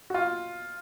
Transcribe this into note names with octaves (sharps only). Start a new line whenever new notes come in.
F#4
F4